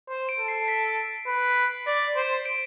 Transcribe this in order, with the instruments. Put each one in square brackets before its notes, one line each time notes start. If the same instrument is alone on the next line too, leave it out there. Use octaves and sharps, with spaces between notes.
[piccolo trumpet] C5
[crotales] D7
[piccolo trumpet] A4
[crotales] C7
B6
[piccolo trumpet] B4
[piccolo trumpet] D5 [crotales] B6
[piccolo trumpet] C5
[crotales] D7